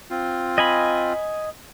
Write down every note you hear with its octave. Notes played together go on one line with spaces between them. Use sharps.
C4 F4
D#5 G#5 B5